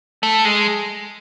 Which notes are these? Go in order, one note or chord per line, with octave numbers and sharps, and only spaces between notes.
A3
G#3